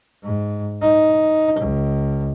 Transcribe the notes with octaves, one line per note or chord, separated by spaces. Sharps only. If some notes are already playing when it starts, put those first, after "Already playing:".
G#2
D#4
C#2